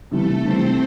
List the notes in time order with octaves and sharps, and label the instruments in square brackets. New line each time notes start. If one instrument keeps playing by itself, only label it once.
[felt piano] C3 E3 G3 [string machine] A3 A4
[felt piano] C3 E3 G3 [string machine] C4 C5